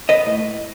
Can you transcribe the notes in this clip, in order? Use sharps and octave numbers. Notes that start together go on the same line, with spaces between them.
B4 D#5
A2